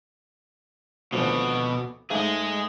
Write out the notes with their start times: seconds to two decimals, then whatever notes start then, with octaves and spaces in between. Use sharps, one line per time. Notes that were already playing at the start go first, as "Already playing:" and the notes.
1.12 G#1 D2 B2 F3
2.10 G#2 A3 G#4 D#5